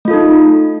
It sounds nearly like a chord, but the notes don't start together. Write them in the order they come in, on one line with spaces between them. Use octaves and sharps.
A3 F4 A4 D#4